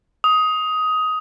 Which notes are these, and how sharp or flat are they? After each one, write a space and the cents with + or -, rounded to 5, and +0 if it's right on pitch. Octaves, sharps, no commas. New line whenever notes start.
D#6 +15